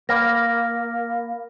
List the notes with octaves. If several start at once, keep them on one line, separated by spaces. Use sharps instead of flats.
A#3 B5 F6 A#6